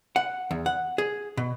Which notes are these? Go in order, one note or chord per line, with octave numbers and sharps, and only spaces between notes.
F#5
E2
F#5
G#4
B2